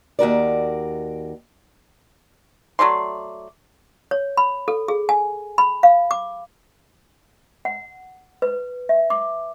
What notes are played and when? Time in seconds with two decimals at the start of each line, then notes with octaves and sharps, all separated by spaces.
0.19 D#2 F#4 A#4 D5
2.79 F#3 A3 D5 C6
4.11 C#5
4.37 B5
4.68 A4
4.88 G#4
5.09 G#5
5.58 B5
5.83 F5
6.11 D6
7.65 F#5
8.42 B4
8.89 E5
9.10 D6